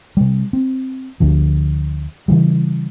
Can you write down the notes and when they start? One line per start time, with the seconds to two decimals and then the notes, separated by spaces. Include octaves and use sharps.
0.17 C3 G3
0.53 C4
1.20 D2 D3 F3
2.28 C#3 E3 G3